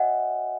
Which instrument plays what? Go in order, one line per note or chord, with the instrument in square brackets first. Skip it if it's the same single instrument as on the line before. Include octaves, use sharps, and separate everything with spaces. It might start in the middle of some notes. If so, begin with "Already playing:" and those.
Already playing: [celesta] F#4 C#5 D#5 E5 F#5 G#5